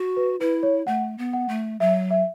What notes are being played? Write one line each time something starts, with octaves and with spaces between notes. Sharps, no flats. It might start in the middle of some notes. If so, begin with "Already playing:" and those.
Already playing: F#4
B4
E4 B4
C#5
A3 F#5
B3
F#5
A3
F#3 E5
E5